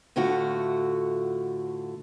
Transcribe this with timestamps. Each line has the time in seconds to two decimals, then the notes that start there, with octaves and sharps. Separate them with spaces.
0.16 A2 D3 A3 F4 F#4